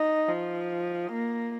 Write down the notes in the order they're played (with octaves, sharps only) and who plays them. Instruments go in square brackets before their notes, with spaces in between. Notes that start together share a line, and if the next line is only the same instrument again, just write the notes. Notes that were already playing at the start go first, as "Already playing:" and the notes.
Already playing: [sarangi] D#4
F3
A#3